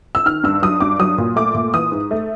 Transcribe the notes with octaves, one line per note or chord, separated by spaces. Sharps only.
E6
D#3 F6
G2 E6
F#3 D#6
G2 D6
F#3 D#6
A#2
A3 D6
A#2
E3 D#6
G#2
A3